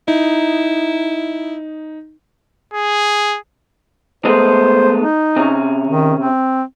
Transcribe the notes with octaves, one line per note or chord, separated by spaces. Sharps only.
D#4 E4
G#4
G#3 A3 B3 C5
D#4
C3 C#4
D#3
C4